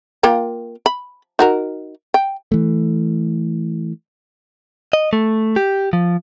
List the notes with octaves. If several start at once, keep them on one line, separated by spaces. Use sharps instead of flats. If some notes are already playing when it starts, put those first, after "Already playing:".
A#3 F4 G5
B5
D#4 F#4 A#4
G5
E3 A3
D#5
A3
G4
F3